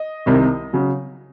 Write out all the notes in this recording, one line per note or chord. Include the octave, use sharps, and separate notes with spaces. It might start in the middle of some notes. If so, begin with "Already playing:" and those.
Already playing: D#5
C2 C3 D#3
C#3 F#3